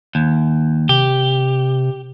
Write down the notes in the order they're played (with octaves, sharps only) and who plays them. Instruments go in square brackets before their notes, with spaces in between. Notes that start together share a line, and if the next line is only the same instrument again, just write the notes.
[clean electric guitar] D#2
[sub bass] C3 [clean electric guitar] G4